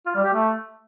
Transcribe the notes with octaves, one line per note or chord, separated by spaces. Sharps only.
F4
G3
G4
A3